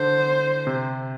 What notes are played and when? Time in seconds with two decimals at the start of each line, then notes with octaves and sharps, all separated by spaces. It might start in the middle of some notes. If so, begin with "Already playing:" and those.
Already playing: D3 C5
0.67 C3